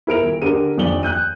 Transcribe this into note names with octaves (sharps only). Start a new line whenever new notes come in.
E4 A#4 D7 F7
D#1
D3 G4 A#4 D#7
D#1 F2 D4 D5 F#7 G7
F#6 G6 D#7